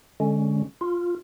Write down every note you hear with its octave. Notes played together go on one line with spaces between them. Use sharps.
D3 G#3 C#4
F4